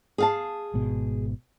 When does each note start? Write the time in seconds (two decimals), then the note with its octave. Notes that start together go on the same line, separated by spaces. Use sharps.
0.18 G#4 F5 A5
0.74 G#1 G#2 B2